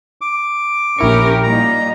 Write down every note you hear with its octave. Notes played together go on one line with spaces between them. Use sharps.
D6
A#1 C#4 E4 G4 A#4 C#6
A#2 G3 D#4 A#5